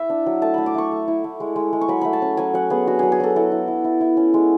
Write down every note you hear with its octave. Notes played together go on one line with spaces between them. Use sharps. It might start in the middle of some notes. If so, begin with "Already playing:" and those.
Already playing: E4 E5
D4
F#3
A3 A5
A3 B5
D6
A3 C#6
A3
E4
A3
G#3
G#3
G#3
C#6
F#3 B5
A3 B5
A5
C#4
F#3 G#5
F#3 F#5
B3 G#4
D4 F#4
F#3 G#4
G#4
F#3 A4
E4 A4
E4
E4
E4
E4
C#4
G#3